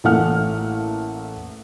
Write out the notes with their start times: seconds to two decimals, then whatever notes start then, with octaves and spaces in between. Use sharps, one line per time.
0.04 A1 E3 A3 A#3 F#5 F6